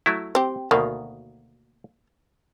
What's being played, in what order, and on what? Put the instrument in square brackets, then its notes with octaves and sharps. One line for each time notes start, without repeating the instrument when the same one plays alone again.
[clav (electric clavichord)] F#3 A3 E4
[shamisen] C4 G4
[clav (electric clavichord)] D2 B2 D#3 [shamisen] A#3